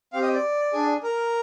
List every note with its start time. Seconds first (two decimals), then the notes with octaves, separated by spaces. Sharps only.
0.13 C4 G4 F5
0.22 D#5
0.34 D5
0.73 D4 G#4
1.03 A#4